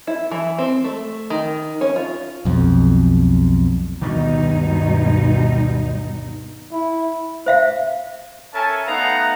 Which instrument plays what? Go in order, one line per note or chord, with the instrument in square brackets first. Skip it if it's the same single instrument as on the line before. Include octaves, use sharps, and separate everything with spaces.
[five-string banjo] E4
E3
C4
A3
D#3
C#4
F4
[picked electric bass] B1 F2
[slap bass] D2 D#3 D4 [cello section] G2 B2 D#4
[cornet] E4
[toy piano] C5 E5 F5
[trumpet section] C#4 A4 A#4 E5 G#5 A5
A3 B3 D#4 F5 F#5 A#5